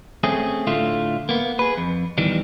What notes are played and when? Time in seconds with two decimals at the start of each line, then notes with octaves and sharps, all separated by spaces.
0.24 A3 C4 C#4 G#4
0.67 A2 D3 A3 F4
1.29 A#3 B3
1.59 G#4 B4
1.77 F2
2.18 E2 D#3 E3 G3